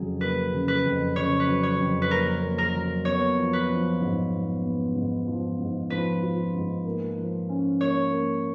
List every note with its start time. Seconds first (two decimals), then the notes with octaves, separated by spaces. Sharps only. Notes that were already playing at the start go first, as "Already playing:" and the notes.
Already playing: F2 C#3 F#3 G#4
0.21 A#3 B4
0.52 C#3
0.68 B4
0.85 F2
1.16 C#3 C#5
1.40 B4
1.47 F#3
1.63 C#5
1.80 F2
2.02 B4
2.10 A#3 A#4
2.42 A#3
2.58 A#4
2.74 F#3
3.05 B3 C#5
3.37 F3
3.53 B4
3.69 F3
4.00 G#2
4.33 B3
4.63 B3
4.95 G#2
5.27 F3
5.59 G#2
5.90 F3 B4
6.22 F4
6.54 G#2
6.85 A#3
7.17 F3
7.49 C#4
7.79 A#3 C#5
8.12 A#3